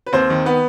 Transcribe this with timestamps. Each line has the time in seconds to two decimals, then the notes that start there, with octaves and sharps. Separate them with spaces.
0.06 B4
0.13 D#2 C4 C5
0.30 D#3
0.46 B3 B4